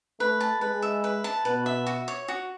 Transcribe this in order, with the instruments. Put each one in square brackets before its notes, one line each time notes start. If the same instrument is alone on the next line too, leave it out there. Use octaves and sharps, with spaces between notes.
[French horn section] A3 [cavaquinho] B4
[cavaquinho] A5
[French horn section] G#3 [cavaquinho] B4
[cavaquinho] E5
B4
A5
[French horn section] B2 [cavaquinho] B4
[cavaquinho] E5
F#4
C#5
F#4